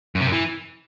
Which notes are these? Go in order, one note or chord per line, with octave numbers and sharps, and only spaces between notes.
F#2
C3
F#2
E3